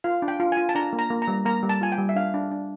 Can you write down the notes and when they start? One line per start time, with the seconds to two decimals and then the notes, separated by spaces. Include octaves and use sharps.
0.04 F4 F5
0.22 D4
0.28 G5
0.40 F4
0.52 F4 G#5
0.69 A5
0.75 D4 A#5
0.93 A#3
0.99 A#5
1.10 A#3
1.22 A#5
1.28 G3
1.45 A#3 A#5
1.63 G3
1.69 A5
1.81 F4 G#5
1.92 G5
1.98 G3
2.09 E5
2.15 D4 F5
2.34 D4
2.51 D4